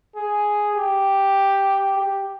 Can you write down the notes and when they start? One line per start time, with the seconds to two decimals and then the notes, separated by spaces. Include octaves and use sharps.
0.16 G#4
0.76 G4
1.97 G4